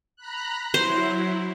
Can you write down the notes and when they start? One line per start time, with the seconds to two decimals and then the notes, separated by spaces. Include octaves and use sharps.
0.16 A#5 B5 F#6
0.74 F#3 E4 C5